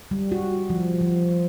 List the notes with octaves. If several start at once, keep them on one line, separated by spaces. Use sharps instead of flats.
G3
F#4
F3
F3